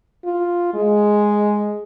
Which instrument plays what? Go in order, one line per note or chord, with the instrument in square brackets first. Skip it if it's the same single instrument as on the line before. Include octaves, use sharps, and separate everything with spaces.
[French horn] F4
G#3